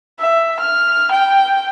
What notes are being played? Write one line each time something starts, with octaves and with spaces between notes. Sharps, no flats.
E5
F6
G5